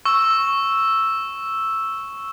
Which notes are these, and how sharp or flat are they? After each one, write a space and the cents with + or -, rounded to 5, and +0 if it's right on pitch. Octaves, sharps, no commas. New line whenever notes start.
C#6 +0 E6 +0